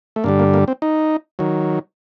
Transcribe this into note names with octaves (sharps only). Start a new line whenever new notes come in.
A3
G2 D3 G3 A#3
A#3
A#3
C4
D#4
D#3 F#3